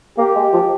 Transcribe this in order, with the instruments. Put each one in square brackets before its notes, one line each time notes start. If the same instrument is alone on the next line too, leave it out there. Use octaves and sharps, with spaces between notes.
[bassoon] A#3 [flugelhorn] G4
[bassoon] G#3
F3